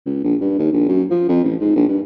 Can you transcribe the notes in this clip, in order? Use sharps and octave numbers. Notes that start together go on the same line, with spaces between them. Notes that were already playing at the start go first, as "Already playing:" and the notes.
C#2
A#1
G2
D#2
A#1
F#2
F3
F2
A1
G#2
A#1
G2